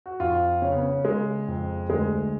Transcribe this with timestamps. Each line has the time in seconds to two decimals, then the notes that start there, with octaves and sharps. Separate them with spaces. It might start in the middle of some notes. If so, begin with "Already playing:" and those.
0.06 F#4
0.20 F2 F4
0.62 C#3 C#4
0.72 B3
0.82 C#4
1.05 C#3 G#3
1.48 F2
1.90 D2 G#3